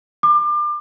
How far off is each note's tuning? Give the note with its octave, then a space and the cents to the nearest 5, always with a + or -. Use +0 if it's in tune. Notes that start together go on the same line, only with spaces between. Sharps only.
D6 +30